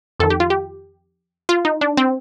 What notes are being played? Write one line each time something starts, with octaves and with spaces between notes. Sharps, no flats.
F2 D#3 A4
G4
F4
G4
F4
D#4
D4
C4